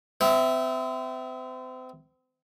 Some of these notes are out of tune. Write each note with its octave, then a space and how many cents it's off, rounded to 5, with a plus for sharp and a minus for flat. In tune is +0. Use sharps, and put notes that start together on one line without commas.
C4 -35 E5 +0